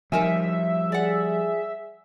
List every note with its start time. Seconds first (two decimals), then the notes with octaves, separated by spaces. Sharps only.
0.12 F3 G3 D#4 A#4 E5 G#5
0.92 G#4 D5 F#5